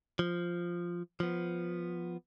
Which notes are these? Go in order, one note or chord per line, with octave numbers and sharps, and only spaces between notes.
F3
F3 B3